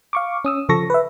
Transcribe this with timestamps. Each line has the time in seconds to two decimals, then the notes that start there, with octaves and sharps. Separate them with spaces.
0.13 F5 C#6 D6
0.45 C#4 D#6 E6
0.69 C#3 F3 A4 C#6 A#6
0.90 B4 E5